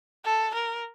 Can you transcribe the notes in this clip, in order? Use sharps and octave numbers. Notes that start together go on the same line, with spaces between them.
A4
A#4